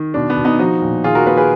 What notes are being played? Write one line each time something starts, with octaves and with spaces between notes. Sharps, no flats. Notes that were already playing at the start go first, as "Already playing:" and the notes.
Already playing: D#3
B2 D4
B3
B2
B3 D#4
F3 D#4 F#4
A#2
D#3 F4 G#4
F#4 A#4
A#3 G#4 B4
G#4 B4